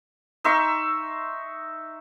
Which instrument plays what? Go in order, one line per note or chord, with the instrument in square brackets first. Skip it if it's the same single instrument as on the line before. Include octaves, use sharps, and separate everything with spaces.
[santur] D#4 E5 C6 C#6